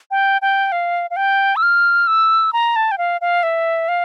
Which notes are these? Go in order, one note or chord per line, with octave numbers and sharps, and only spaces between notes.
G5
G5
F5
F5
G5
E6
F6
E6
A#5
A5
G5
F5
F5
E5
F5